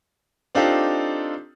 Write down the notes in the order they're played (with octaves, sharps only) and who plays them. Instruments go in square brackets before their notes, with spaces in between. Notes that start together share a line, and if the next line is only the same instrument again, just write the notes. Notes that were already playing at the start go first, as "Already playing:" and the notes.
[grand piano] C4 D4 D#4 F4 G4 A4